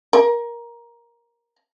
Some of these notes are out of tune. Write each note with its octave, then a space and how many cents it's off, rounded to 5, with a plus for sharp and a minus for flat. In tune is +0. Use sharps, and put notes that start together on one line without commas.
A#4 +15